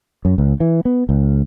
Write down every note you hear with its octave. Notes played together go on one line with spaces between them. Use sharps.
F#2
C#2
E3
B3
C#2